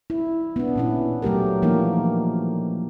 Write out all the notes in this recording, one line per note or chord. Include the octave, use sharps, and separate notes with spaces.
E4
B3 D4
A#2 C#4 E4
F#3 A3 G4 A#4
E3 F3 A#3 D4 D#4 A#4